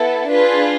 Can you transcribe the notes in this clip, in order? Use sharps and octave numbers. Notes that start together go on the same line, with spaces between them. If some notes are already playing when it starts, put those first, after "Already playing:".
Already playing: B3 E4 A4
D4 F4 G#4 B4